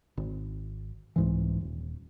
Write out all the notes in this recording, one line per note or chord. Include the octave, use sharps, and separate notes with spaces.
G#1
C2 G#2 E3
D#1